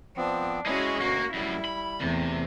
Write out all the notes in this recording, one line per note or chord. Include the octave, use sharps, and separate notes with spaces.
F3 B3 C4 D4
G#3 C#4 E4 F#4 G#4 D#5
D2 B2 A#3 F#4
F#2 A2 G3 E4
B5
E2 C3 A3